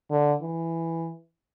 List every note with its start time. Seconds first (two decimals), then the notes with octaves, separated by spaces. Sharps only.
0.11 D3
0.42 E3